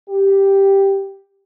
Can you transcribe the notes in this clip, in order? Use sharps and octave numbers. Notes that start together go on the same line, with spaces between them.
G4